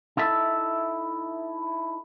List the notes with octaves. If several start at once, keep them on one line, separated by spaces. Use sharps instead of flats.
D#4 E4 A4 E5